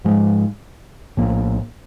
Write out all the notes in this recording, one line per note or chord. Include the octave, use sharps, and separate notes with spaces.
G#2 F3 G#3
A#1 A2 F3 A#3